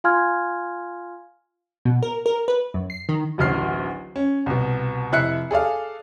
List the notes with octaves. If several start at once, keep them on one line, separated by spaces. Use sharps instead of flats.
F4 F5 G#5 C6 F6 G#6
B2
A#4
A#4
B4
F#2
C7
D#3
D1 A1 D2 F6 C7
C#4
C2 B2
F1 E4 E5 F#6 C7 C#7
G#4 A4 D5 F5